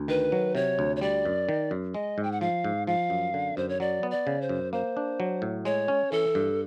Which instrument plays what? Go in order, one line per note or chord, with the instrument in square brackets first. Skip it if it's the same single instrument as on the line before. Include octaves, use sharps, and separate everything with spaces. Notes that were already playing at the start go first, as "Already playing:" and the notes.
Already playing: [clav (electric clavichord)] D2
[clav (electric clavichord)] D#3 [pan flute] B4
[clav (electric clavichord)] F#3
[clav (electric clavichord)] C3 [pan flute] C#5
[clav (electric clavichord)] D2
[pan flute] C#5
[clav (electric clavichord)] G3 [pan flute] D5
[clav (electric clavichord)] F#2
D#3
F#2
[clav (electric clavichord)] G#3 [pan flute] D#5
[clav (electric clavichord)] G#2
[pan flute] G5
F#5
[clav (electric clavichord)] F3 [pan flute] F5
[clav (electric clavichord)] G#2
[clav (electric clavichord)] F3 [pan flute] F5
[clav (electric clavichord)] F#2
D3
[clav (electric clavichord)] F#2 [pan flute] C5
[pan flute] C#5
[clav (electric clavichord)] F#3 [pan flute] D5
[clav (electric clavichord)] B3
[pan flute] D5
[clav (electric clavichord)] C#3
[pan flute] C5
[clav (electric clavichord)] F#2
[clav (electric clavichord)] A#3 [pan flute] C5
[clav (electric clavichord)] D4
F#3
A2
[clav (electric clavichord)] G#3 [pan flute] C#5
[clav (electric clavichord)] C#4
[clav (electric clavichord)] E3 [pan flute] A4
[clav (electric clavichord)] G2